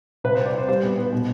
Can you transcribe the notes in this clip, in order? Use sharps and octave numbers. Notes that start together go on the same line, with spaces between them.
C3 B4
C4 C5
D5
C4 C5
G3 C5
B3
B3
B2